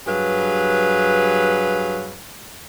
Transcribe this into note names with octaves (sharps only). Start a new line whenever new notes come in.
G2 F#3 G#4 B4 F5